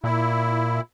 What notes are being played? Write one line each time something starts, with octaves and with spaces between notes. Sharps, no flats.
A#2 E4